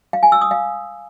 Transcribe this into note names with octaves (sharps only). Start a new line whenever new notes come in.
F5
G#5
E6
D#6
F5